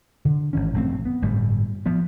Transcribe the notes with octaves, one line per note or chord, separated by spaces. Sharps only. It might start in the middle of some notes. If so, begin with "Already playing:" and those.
D3
G#1 E3 C#4
A#1 G2 A3 C4
B3
G1 A2 G3 A3
F3 B3